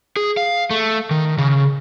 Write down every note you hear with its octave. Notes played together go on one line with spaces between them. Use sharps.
G#4
F5
A3
D#3
C#3